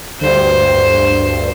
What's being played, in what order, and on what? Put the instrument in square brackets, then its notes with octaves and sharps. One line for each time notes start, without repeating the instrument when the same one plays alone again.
[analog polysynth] D2 G2 [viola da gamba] C5